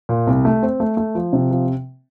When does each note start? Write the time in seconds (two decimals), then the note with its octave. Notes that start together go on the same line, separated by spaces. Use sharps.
0.09 A#2
0.27 C2
0.45 A3
0.63 C4
0.80 A3
0.97 A3
1.15 F3
1.33 C3
1.51 F3